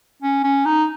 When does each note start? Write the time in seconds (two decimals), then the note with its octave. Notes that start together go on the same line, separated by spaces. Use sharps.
0.22 C#4
0.44 C#4
0.66 D#4